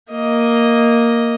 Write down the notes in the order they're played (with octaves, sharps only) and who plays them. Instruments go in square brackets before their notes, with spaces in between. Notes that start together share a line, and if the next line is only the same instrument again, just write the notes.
[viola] A#3 D#5